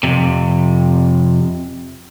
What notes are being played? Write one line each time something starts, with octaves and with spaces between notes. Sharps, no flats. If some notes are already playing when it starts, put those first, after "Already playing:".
F2 C3